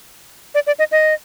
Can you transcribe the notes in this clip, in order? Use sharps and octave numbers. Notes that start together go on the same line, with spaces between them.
D5
D5
D#5
D#5